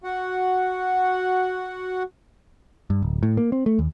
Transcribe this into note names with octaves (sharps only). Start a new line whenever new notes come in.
F#4 F#5
G2
D1
A2
A#3
C4
A3
D#2